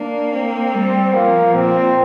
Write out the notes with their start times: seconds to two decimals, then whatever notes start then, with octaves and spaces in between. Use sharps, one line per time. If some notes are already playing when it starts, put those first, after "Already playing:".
Already playing: A#3 D4
0.33 C4
0.74 G3
1.13 F3 A#3
1.54 A#2 C4